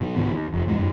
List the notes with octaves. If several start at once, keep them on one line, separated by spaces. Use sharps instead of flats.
B2 F#3
C2 G#2 D#3 B3
D#2
F1 F2
E2 A2 C3 G#3
F#2 B2